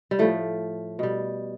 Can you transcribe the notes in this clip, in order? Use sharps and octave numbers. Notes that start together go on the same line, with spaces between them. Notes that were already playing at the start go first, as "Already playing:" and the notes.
G3
A2 F3 A3
B2 G3